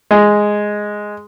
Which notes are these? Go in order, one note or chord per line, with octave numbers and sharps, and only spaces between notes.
G#3